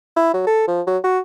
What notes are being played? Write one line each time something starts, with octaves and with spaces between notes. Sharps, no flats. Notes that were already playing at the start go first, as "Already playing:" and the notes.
E4
F#3
A4
F3
F#3
F#4